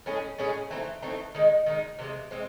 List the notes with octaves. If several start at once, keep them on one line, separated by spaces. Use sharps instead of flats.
A2 G#3 C#4 G#4
A2 G#3 C#4 G#4
E3 A3 C4 D#4
E3 A3 C4 D#4
D#3 G#3 D#4
D#3 G#3 D#4
C3 E3 G#3 C4
E3 G#3 C4